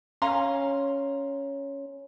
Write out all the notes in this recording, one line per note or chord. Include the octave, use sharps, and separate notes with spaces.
C#4 F5 A#5 C6